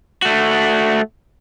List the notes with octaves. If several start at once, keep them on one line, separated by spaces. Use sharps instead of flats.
A3 F#4